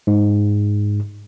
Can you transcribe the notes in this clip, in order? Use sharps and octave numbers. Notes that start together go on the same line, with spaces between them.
G#2